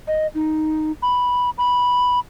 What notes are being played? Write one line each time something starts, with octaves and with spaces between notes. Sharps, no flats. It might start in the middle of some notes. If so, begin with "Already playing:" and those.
D#5
D#4
B5
B5